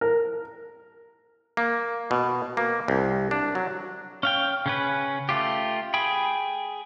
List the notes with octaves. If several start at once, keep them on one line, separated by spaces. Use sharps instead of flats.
A#4
A#3
B2
A#3
C2
D4
F#3
C#4 F5 G5
C#3 C#4 B4
A3 F4 G4
G#4 G5 B5